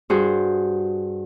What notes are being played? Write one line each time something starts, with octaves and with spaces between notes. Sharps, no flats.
G2 F#4 G#4 C5